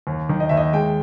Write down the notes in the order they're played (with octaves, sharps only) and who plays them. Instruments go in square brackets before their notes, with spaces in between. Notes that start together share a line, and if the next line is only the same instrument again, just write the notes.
[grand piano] D#2
D#3
D#5
D#2 E5
D#5
G#3 G5